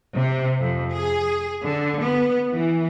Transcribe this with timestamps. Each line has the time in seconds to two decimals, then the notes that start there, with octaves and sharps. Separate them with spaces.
0.17 C3
0.60 F2
0.94 G#4
1.65 D3
2.02 B3
2.53 E3